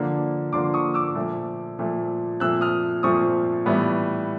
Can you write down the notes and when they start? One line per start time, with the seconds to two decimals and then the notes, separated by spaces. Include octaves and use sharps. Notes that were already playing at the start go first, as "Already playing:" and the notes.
Already playing: D3 F3 A#3 D4
0.53 D3 F3 A#3 D4 C6 D6
0.74 C#6 D#6
0.94 D6 E6
1.15 A#2 F3 A3
1.79 A#2 F3 A3
2.40 A#2 F3 A3 C4 E6 F#6
2.61 D#6 F6
3.03 A#2 F3 A3 C4 C#6 D#6
3.66 A2 E3 G3 B3